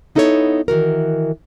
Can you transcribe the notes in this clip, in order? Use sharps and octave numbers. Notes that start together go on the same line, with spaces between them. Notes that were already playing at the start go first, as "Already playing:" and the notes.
B3 D#4 E4 A4 C5 C#5
D#3 E3 F#4 A#4